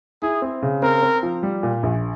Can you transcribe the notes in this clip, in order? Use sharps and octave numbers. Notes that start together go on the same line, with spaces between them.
E4 G#4
C4
C#3
C4 A#4
C4
F3
G3
A#2
A#1